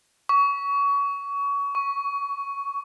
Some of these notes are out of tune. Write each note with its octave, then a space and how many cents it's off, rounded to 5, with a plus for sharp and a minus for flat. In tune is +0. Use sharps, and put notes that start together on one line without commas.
C#6 +25
C#6 +10